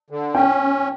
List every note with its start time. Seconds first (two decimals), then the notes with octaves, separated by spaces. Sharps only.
0.10 D3
0.34 C#4 G5